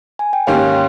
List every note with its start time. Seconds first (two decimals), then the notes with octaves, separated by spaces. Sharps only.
0.19 G#5
0.33 G5
0.47 G#2 D#3 A#3 C#4 G4 C#5 F5